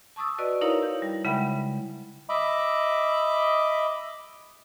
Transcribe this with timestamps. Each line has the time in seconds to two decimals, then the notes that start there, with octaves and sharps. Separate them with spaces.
0.16 A5 C#6 D#6 E6 A6
0.38 F#4 B4 D5 D#5
0.61 D#4 E4 A#4 C#5 F5 A#5
0.83 G6
1.02 G3
1.25 C#3 G#3 E5 F#5 G5 B5
2.29 D#5 E5 B5 D6